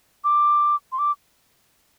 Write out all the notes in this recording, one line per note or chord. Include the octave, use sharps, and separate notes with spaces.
D6
C6
D6